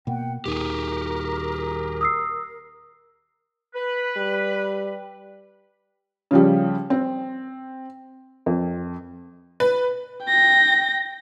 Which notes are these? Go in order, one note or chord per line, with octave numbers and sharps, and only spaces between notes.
B2 A#3 F#5 G5
D#1 D#2 D#3 G4 G#4 A#4
D#6 E6 C7
B4
G3
C#3 F3 G3
C4
F2
B4
G5 A#6